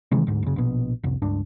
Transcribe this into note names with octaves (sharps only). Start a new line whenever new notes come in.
C3 D#3 E3 G#3
D2 G#2
F#1 C#3
A#1 B2
F1 C2
C#2 G2 D4